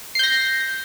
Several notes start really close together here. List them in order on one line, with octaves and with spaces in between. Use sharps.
C7 G6 A#6